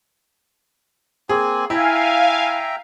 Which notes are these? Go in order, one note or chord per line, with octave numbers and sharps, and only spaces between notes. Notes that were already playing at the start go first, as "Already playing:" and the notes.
A#3 C4 G#4 G#5
E4 E5 F5 G5 G#5 A#5